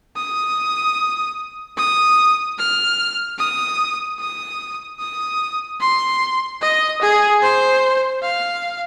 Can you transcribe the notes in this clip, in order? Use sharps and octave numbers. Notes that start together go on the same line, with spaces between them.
D#6
D#6
F6
D#6
D#6
D#6
C6
D#5
G#4
C5
F5